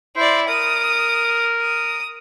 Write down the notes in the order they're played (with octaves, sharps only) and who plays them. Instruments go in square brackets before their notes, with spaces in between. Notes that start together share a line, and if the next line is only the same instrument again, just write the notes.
[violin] E4 D5 [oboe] C5
[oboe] A#4 [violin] D#6
[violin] D#6